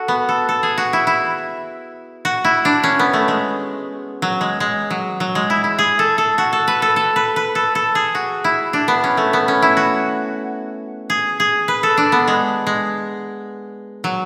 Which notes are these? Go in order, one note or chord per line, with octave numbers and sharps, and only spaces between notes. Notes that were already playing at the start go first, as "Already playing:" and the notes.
Already playing: F#4 A4
B3
A4
A4
G#4
F#4
E4
E4
F#4
E4
D4
C#4
B3
A3
G#3
F#3
G#3
G#3
F#3
F#3
G#3
E4
E4
G#4
A4
A4
F#4
A4
B4
A4
A4
B4
B4
A4
A4
G#4
F#4
E4
D4
B3
C#4
A3
B3
C#4
E4
F#4
G#4
G#4
B4
A4
D4
B3
G#3
G#3
F#3